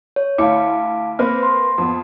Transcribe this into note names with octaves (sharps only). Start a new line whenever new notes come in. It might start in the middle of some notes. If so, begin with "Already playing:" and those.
C#5
D2 E4 F5 A5 D6 C#7
A#3 C4 B4 C5 F6
C6
F2 B3